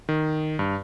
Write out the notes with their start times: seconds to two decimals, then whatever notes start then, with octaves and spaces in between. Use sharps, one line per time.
0.09 D#3
0.59 G2